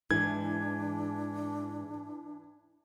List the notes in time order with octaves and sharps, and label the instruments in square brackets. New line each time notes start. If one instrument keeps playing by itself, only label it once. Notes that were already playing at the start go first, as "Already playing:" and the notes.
[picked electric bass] G#2 [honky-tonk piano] E3 [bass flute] D4 [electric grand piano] G#6